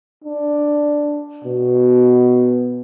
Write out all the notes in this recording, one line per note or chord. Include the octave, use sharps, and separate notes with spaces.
D4
B2